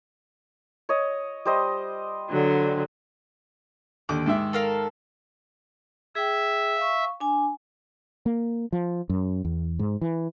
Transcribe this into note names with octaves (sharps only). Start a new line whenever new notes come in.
C#5 D#5
G3 C5 D#5
D3 F#3
D#2 D3 D6
G#2 D#3 E5
A4 A#4 F5
G#4 E5 G5
F5 C#6
D4 G#5
A#3
F3
F#2
E2
G#2
E3